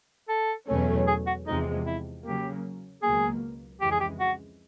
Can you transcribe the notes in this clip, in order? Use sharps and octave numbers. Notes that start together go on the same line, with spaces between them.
A4
E2 B2 F#3 A3 C#4
G#4
F#4
E2 C3 F3 G#3 D#4
E4
C#3 F#3 A#3 G4
C#2 B2 F#3 A#3 G#4
F2 C#3 E3 G#3 G4
G#4
G4
F#4